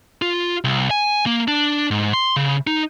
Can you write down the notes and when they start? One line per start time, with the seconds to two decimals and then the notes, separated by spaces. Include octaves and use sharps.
0.22 F4
0.64 C2
0.91 G#5
1.26 A#3
1.48 D4
1.91 G#2
2.13 C6
2.36 C#3
2.67 D#4